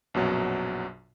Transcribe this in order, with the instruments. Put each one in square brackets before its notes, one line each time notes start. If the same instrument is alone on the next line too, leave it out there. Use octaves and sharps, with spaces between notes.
[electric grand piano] A#1 F#2 B2 F#3